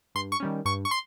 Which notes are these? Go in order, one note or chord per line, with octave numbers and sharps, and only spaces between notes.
G2 C6
C#6
D#3 G3 C#4
G2 C#6
C#6
C6